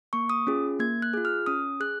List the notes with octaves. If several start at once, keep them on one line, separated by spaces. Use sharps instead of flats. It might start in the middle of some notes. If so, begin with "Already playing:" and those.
A#3 C#6
D#6
C#4 F4 G#4
A#3 G#6
F#6
F4 G#4
F6
C#4 D#6
G#4 F#6